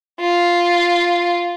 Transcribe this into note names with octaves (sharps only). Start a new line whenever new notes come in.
F4